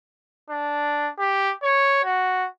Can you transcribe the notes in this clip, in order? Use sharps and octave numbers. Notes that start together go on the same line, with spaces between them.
D4
G4
C#5
F#4